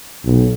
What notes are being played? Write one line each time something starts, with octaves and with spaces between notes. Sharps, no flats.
B1